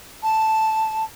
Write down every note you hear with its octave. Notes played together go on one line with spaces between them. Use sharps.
A5